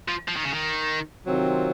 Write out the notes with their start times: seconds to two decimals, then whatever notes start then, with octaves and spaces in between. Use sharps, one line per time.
0.08 F3
0.28 F3
0.36 D#3
0.44 C#3
0.52 D#3
1.26 C3 D#3 F#3 C4 F4